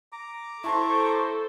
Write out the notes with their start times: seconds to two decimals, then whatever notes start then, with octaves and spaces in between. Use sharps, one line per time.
0.12 A#5 D6
0.64 E4 A4 C5 A5 C6 C#6